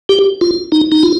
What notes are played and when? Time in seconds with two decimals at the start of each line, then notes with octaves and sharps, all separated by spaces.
0.09 G4
0.41 F4
0.72 D#4
0.92 D#4
1.03 F4